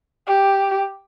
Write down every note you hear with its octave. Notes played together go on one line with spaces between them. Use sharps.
G4